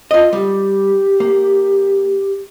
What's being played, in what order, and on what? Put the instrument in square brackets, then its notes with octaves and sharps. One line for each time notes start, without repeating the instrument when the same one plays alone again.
[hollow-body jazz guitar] F4 D#5
[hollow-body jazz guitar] G3 [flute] G4
[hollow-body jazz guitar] A#3